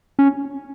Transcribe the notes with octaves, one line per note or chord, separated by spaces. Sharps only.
C#4